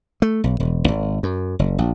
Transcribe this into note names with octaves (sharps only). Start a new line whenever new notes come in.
A3
B1
E1
G#1
F#2
F#1
A#1